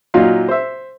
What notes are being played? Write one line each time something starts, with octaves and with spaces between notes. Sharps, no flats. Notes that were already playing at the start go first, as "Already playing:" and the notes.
A#2 F#3 D#4 F4 F5
C5 E5